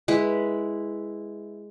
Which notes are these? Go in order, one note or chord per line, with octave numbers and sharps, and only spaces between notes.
G#3 E4 B4